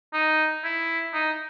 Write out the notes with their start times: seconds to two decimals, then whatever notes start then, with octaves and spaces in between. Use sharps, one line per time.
0.13 D#4
0.64 E4
1.13 D#4